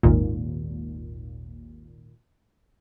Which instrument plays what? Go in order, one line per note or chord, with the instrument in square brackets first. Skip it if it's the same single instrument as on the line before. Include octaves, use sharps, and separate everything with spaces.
[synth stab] G#1 D#2 A#2